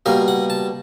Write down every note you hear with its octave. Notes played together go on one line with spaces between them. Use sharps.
B2 G3 A#3 F5
F#5
A5